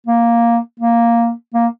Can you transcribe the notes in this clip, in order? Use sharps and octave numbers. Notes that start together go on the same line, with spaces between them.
A#3
A#3
A#3